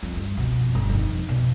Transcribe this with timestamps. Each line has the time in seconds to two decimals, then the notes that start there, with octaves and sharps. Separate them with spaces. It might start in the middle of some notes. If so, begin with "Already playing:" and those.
0.03 F2
0.16 G2
0.37 F2 B2
0.75 G1
0.90 F2 D#3
1.29 B2